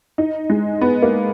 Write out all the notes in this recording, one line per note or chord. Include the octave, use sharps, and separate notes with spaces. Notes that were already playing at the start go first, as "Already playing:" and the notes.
D#4
G#3
B3
A#3